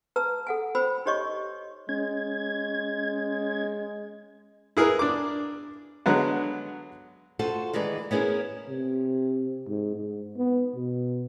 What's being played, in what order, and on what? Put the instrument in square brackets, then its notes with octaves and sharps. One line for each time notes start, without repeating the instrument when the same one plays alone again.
[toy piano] B4 A5 A#5 E6
A4 F#5 G#5
F#4 C5 G5 B5 E6
D#4 G4 C#5 D#5 C#6
[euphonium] G#3 [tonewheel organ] C#4 G#6
[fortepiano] E4 G#4 A#4 B4
D4 D6
D3 F#3 G#3 B3
[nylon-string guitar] F4 F#4 A4 C5
D#3 E3 G#3 B4 D5
B3 C#4 E4 G#4 A#4
[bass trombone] C3
G#2
G#2
B3
B2